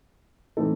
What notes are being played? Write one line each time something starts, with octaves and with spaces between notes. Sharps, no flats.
A2 E3 C4 D#4 A4